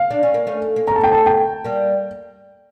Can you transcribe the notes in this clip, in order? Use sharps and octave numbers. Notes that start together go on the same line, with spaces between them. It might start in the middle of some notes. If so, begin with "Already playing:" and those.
Already playing: F5
D4
C#4
A#3
A3 C#4
A#3
A3 C#4 A#5
A5
G5
A5
G5
G3 A#3